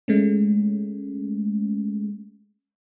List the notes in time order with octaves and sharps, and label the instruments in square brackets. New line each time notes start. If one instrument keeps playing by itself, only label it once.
[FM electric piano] G#3 A3 C#4